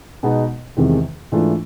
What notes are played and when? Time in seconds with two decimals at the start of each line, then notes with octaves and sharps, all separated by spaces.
0.23 B2 G#3 B3 D#4
0.77 E2 C3 D#3 G#3
1.32 G#2 E3 A3 D4 F4